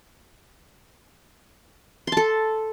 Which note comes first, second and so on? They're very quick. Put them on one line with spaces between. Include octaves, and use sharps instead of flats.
C6 A5 A4